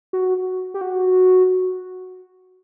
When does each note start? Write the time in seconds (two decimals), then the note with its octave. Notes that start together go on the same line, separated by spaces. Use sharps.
0.13 F#4
0.74 G4
0.81 F#4